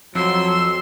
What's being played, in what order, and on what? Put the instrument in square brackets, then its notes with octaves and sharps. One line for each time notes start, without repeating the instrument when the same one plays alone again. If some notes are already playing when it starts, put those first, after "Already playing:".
[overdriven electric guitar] F2 [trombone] F#3 [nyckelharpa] C6 [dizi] E6